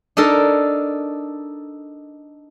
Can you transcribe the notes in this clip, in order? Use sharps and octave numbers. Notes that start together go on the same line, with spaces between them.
D4 D#4 A4 A#4